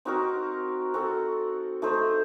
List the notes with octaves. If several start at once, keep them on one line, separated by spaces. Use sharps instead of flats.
C4 D#4 F#4 A#4
C4 F#4 A4
A3 D#4 A4 C5